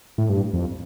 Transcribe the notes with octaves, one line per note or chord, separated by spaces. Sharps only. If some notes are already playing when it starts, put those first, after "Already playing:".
A2
G2
F2